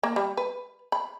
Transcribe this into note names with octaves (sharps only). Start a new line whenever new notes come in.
A#3
G3
B4
B5